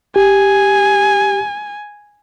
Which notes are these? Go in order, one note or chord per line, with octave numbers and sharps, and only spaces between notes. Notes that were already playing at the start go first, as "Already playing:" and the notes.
G4 G#5